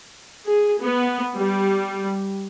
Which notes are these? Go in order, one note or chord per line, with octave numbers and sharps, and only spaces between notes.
G#4
B3
G3